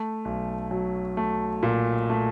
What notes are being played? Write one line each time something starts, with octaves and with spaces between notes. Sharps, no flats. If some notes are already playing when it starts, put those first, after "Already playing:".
Already playing: A3
B1
F#3
A3
A#2
A3